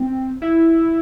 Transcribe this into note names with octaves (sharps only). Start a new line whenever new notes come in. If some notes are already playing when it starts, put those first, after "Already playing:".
Already playing: C4
E4